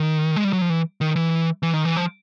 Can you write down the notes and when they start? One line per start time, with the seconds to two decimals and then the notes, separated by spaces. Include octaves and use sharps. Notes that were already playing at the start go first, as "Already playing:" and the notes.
Already playing: D#3
0.36 G#3
0.44 G3
0.53 F#3
0.61 F3
0.70 E3
1.01 D#3
1.16 E3
1.63 E3
1.74 D#3
1.85 E3
1.97 F3